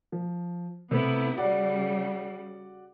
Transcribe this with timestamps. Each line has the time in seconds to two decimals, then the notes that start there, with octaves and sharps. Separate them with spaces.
0.12 F3
0.91 C3 A3 B3 E4
1.37 C#3 G3 F#4 D5 F#5